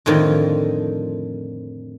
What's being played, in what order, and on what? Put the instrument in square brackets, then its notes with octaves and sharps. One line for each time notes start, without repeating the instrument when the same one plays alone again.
[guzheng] F2 A2 D3 D#3 F3